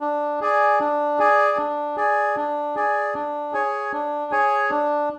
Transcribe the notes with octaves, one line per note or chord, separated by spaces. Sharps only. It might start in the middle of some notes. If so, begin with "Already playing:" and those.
D4
G#4 D5 G#5
D4
G#4 D5 G#5
D4
G#4 D5 G#5
D4
G#4 D5 G#5
D4
G#4 C#5 G#5
D4
G#4 C#5 G#5
D4